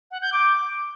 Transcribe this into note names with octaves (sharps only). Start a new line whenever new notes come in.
F#5
G6
D6